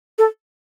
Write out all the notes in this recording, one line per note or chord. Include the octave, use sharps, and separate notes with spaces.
A4